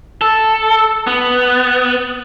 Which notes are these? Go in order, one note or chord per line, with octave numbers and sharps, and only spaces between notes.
A4
B3